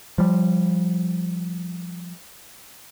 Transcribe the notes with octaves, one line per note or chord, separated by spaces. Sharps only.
F3 G3